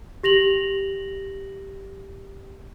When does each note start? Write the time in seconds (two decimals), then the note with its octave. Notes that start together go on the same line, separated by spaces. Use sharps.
0.23 G4 A#6 F7 F#7